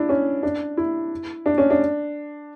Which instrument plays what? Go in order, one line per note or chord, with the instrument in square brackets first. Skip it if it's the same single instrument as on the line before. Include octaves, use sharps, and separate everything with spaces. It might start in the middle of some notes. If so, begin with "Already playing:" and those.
Already playing: [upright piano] D4 E4
C#4
D4
E4
D4
C#4
D4